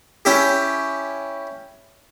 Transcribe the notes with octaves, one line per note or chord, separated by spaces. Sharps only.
C#4 E4 G4